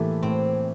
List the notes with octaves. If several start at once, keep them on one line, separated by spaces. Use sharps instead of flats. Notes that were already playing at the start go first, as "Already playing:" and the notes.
Already playing: A2 E3 A3 A#3 E4 G4
A2 C4